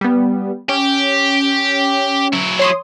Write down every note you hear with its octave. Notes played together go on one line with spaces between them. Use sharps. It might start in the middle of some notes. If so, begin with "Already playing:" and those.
G3 B3
C#4 G4
F#3 E4
C#5 C6 D#6